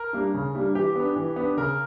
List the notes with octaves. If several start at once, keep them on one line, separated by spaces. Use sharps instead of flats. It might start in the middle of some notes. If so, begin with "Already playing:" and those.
Already playing: A#4
G3 A#3 D4
C#3
G3 A#3 D4
E3 G4
B3 D4
E3
B3 D4
C#3 A#4